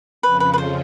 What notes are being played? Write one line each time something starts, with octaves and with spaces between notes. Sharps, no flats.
F2 C#3 F3 B4
B4
B4
C5